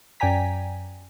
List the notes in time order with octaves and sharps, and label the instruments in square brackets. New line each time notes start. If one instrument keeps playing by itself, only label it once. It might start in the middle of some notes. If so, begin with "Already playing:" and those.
[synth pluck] F#2 D5 G5 G#5 A#5 B6